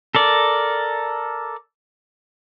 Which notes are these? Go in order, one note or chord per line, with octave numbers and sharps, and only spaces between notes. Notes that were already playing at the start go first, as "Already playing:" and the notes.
A4 A#4 D5